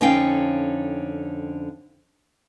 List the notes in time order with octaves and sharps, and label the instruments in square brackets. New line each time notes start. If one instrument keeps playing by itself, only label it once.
[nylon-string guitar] F2 D3 C#4 D#4 F5 G5